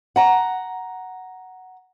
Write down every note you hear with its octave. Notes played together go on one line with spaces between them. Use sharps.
F#5 A#5